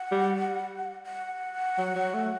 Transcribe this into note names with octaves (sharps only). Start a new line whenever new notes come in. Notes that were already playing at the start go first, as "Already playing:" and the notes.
Already playing: F#5
G3
F#5
F#3
F#3
A3